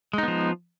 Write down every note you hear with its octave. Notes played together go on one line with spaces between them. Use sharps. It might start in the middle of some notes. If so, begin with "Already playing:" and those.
F3 G#3 B3 D#4